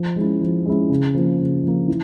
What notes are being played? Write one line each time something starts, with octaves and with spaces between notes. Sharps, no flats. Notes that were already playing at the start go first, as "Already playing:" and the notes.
Already playing: F3
G#3 C#4 E4
F3
G#3 C#4 E4
C#3
F3 A#3
C#3
F3 A#3
E3